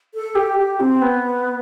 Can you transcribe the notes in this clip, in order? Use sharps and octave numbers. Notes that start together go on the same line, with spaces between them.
A4
G4
G4
C4
B3